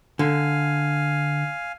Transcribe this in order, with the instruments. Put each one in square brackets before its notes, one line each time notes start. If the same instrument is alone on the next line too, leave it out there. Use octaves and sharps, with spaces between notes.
[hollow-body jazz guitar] D3 [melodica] F5 G#5